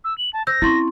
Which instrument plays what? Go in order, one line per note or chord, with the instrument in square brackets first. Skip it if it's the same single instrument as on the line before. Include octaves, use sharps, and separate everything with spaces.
[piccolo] E6
F#7
A5
[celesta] C5 E6 G6 [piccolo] A#6
[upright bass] C4 C#4 [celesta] E4 C6 C#6